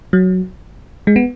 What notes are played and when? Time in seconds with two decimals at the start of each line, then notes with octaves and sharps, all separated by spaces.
0.13 F#3
1.07 G#3
1.16 B3